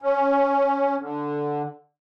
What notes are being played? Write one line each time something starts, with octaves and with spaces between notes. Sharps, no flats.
C#4
D3